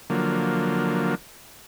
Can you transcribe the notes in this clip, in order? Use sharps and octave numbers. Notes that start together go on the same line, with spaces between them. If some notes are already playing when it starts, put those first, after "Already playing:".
D3 F3 F#3 A#3